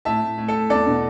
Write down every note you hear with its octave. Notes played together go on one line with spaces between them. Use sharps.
A2 E5 A5
A2
A2
A4
A2
E2 A4 D5
B2